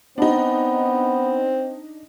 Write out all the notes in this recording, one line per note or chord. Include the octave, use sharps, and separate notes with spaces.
B3 C4 D4 D#4